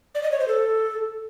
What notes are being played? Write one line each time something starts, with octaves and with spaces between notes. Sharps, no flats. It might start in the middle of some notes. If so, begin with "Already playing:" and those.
D5
D#5
C#5
C5
A4